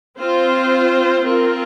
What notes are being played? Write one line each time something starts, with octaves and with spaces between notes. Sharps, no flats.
C4 F4 C5
C4 F4 A#4